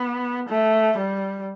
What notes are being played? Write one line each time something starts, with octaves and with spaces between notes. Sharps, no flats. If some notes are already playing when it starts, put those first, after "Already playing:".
Already playing: B3
A3
G3